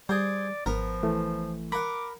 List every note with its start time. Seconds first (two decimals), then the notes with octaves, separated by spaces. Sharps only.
0.09 G3 G#4 C5 D5
0.66 G#1 F3 B3 A#4
1.03 E3 A3
1.72 A#4 F#5 B5 D6